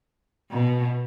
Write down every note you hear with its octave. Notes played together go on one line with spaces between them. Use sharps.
B2